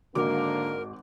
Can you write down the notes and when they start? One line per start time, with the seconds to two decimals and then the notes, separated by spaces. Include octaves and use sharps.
0.15 G#1 G#2 D3 A#3 F#4 A#4 D6